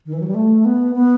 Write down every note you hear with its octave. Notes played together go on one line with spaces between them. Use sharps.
D#3
E3
F#3
G3
A3
B3
B3